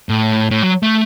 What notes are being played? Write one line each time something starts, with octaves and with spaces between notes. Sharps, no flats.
A2
A2
F#3
A3